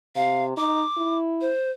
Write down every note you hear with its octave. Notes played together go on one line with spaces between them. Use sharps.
C3 F5
D#4 D6
E4
C5